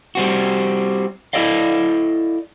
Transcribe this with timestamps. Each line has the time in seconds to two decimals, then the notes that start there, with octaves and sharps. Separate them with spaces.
0.15 G3 C4 F#4
1.33 E4 A4 D5 D#5 F5